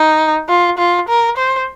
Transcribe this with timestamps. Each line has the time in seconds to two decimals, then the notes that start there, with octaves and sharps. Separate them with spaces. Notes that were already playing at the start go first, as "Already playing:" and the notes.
Already playing: D#4
0.49 F4
0.78 F4
1.09 A#4
1.37 C5